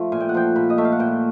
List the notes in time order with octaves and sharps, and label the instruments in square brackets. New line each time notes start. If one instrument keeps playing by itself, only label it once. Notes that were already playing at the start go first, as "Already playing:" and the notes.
Already playing: [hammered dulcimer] F3 A3
A#2 G#5
G5
F#5
F3 G5
A#2 B5
D#5
A3 E5
F5
F#5
A#2 G5